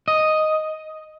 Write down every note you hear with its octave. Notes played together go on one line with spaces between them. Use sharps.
D#5